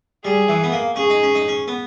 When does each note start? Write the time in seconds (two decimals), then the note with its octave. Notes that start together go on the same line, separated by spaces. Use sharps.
0.25 G3 G#4
0.48 E3
0.64 B3
0.72 A#3
0.96 C#4 G#4
1.10 D#4
1.23 C#4
1.35 D#4
1.48 C#4
1.68 B3